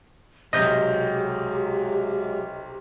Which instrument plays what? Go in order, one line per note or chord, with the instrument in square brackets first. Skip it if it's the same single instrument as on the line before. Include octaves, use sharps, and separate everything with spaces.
[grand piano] B1 C3 G6 [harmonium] F#3 G#3 [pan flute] G4 [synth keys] D#5